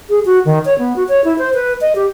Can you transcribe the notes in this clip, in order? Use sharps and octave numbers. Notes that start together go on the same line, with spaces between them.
G#4
F#4
D#3
C#5
B3
F#4
C#5
E4
C5
B4
D#5
G4